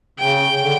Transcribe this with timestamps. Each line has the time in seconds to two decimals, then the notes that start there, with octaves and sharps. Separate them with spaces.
0.19 C#3 G5
0.59 D3